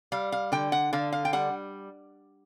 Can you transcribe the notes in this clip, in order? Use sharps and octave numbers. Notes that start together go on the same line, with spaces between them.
G3 F5
F5
D3 G5
F#5
D3 F5
F5
G5
G3 F#5